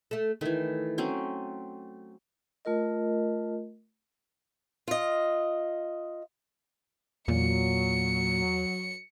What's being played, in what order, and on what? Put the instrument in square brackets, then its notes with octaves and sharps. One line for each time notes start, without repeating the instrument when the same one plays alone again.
[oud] A3 A4
[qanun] D#3 E3 [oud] A3
[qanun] F#3 C4 C#4
[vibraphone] A3 F4 A#4 D#5
[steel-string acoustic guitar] F4 D#5
[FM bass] E2 [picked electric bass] A#2 [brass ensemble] F#3 [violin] C#7